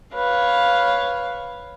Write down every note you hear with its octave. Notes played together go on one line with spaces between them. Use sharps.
B4 C#5 F5